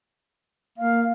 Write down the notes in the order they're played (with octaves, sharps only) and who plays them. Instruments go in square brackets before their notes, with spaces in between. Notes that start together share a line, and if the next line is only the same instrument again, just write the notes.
[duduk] A#3 [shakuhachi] F5